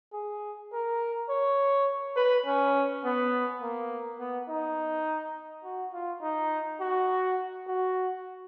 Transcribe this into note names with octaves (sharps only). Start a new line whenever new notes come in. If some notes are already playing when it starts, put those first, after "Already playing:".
G#4
A#4
C#5
B4
C#4
B3
A#3
B3
D#4
F#4
F4
D#4
F#4
F#4